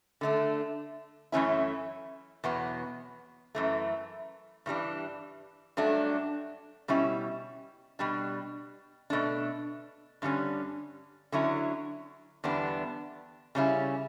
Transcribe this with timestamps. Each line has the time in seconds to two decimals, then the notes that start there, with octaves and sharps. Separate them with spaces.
0.21 D3 A3 D4
1.32 F#2 E3 A3 C#4 E4
2.44 E2 B2 F#3 B3
3.55 F#2 E3 A3
4.66 G2 E3 G3 D4
5.77 G2 F#3 A3 D4
6.88 B2 G3 C#4 E4
7.99 B2 G3 D4
9.10 B2 A3 D4
10.22 G2 D3 G3 C#4
11.32 D3 F#3 C#4 E4
12.44 E2 D3 G3 B3 D4
13.55 C#3 G3 C#4 E4